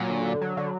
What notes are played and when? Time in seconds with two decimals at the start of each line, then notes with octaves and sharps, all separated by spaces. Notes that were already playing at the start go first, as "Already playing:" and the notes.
Already playing: A#2 F#3
0.10 D3
0.25 D3
0.41 F#3
0.57 D3